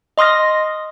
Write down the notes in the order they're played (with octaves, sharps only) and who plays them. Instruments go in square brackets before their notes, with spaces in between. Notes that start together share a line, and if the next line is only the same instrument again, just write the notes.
[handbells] D#5 C6 D#6 F6 A#6